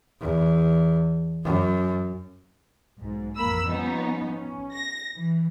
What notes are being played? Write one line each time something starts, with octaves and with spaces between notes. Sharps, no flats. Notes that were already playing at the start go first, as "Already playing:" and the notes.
E2
F#2
B1 G#2
A1 F2 A#3 A#4 B5 E6
F3 G3 B3 C#4 D#4
C#4
A#6
E3